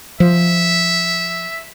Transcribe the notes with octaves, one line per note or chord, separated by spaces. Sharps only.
F3 E5